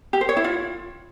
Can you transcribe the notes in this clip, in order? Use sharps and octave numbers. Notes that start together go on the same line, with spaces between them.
G4
C5
C#5
E4
F4